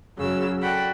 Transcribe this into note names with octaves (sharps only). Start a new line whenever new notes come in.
F#2 C#3 F#3 E6
F#4 A4 D5 F#5 G5 B5